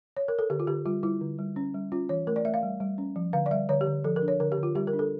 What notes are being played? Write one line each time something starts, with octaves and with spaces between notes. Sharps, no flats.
C#5
A#4
A4
D3 G4
F4
D3 G4
G3 F4
G3 E4
D3
G3
C#4
G3
C#4 F4
E3 C#5
A3 A#4
D5
A3 E5
F5
G3
G3
C#4
F3
D3 F5
D5
G3 E5
D3 C#5
G4
D3
F3 A4
A#4
D4
C#5
D3 A#4
G4
D3
F4
G3 G4
A#4
D4
A4